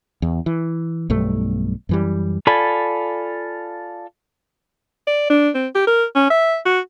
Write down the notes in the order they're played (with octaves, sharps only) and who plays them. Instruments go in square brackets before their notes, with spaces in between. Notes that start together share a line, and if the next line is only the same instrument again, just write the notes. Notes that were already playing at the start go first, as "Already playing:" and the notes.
[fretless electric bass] E2
E3
B1 G2 A3
F#2 E3 G3
[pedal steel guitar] F4 A4 D5 G#5 B5
[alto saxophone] D5
D4
C4
G4
A#4
C#4
E5
F#4